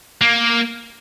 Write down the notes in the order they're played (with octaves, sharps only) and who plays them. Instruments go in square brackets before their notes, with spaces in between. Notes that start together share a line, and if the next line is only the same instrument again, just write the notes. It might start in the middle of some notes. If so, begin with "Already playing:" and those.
[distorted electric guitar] A#3